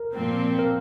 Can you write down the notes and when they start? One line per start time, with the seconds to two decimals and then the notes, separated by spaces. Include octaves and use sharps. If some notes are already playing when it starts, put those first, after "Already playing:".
Already playing: A#4
0.13 A#2 F3 C4
0.59 A#4